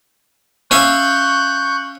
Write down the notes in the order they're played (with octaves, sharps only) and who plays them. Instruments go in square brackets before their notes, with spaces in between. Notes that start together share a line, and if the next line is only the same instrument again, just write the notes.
[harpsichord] C#4 E5 F5 [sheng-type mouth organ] C#6 F#6 G6